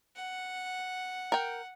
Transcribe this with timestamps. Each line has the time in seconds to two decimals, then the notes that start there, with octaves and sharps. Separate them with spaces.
0.16 F#5
1.32 A#4 G5